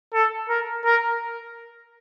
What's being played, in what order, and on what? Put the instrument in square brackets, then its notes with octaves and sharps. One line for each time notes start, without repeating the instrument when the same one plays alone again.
[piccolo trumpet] A4
A#4
A#4